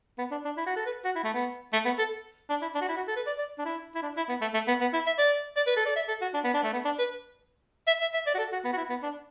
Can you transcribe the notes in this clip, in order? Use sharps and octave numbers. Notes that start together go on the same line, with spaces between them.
B3
D4
D4
E4
F#4
A4
B4
F#4
E4
A3
B3
A3
B3
A4
D4
E4
D4
F#4
E4
F#4
A4
B4
D5
D5
D4
E4
E4
D4
E4
B3
A3
A3
B3
B3
E4
E5
D5
D5
B4
A4
D5
E5
A4
F#4
D4
B3
D4
A3
B3
D4
B4
E5
E5
E5
D5
F#4
A4
F#4
B3
F#4
E4
B3
D4